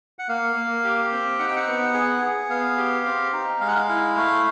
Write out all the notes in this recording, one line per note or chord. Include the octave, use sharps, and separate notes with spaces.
F#5
A#3 F5
A#3
G4
C4
D#4 F#5
G5
F#5
B3
G#4
G#4
B3 F5
G4
C4
D#4
G#3 F5
F#5
F5
E4
A3